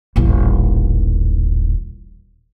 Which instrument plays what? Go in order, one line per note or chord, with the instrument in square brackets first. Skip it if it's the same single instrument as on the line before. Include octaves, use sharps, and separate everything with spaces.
[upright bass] D#1 A1